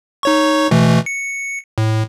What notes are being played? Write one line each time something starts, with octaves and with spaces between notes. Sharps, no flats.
D#4 C#5 C#6
B2 E3 A3
C#7
A2